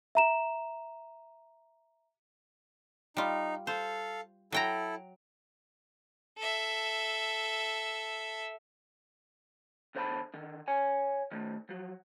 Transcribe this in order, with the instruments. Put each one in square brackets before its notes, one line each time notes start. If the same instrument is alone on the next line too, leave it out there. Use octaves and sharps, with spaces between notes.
[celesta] E5 A#5 E7
[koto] G3 F4 [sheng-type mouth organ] D#4
[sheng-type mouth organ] A4 F5 [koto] C5
[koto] F#3 G5 A#5 [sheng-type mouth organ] E4 A4
[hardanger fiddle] A4 E5
[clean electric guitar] E2 D3 C5 D#5 A5 B5
D3 D#3
C#5 G#5
D#3 A3
F3 F#3